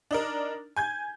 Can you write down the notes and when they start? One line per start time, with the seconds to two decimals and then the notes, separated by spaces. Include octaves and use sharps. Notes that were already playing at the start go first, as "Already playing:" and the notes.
0.11 D4 D#4 A#4
0.76 G#5 G6 G#6